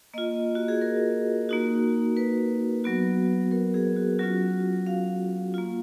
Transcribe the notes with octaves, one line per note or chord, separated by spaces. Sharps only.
A#3 F4 D#5
F#4
G#4
A#4
A#3 D#4 F#4
B4
F#3 B3 F#4
A#4
G#4
F#4
F#3 C#4 F4 F#4
F5
A#3 F4